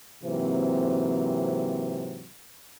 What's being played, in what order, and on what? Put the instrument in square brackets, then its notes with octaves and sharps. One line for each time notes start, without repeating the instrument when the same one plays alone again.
[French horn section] G#2 C3 E3 F#3 A#3 C4